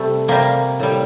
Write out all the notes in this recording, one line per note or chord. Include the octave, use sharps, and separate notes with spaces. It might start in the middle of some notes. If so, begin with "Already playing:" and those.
Already playing: C3 G3 A3
C3 G3 A#3
A2 G3